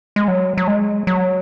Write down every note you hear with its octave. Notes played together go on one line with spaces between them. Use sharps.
G#3
F#3
F#3
G#3
F#3